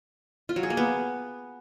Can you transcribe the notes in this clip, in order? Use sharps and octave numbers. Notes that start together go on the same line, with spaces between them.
F4
F#3
G#4
A#3
B3